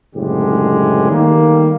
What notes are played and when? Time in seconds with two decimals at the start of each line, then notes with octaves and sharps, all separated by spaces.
0.15 F#1 A2 D3 G#3 G4
1.10 D#3 G3 A3 A#3